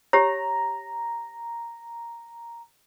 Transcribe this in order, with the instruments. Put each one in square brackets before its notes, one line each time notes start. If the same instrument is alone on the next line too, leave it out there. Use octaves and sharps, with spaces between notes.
[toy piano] G4 C#5 [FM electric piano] A#5